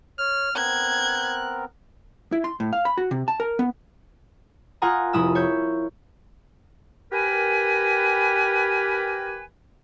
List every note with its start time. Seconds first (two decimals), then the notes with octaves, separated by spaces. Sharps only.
0.19 C#5 F6
0.56 B3 C4 A#4 F#6 G#6
2.32 E4
2.44 C6
2.60 A2
2.73 F5
2.85 B5
2.98 F#4
3.11 C3
3.28 A5
3.40 A#4
3.59 B3
4.82 F4 A#4 F#5 G#5 A#5 D#6
5.13 F1 E4 D#6 E6
5.35 C#5 E5 G6
7.12 G4 A#4 B4 G#5